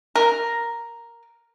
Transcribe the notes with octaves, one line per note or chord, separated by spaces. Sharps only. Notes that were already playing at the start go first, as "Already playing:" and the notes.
A#4